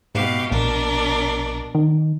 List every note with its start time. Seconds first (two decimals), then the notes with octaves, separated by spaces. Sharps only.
0.15 G#2 B2 G4 F5
0.51 A#1 B2 D4 A#4
1.75 D#3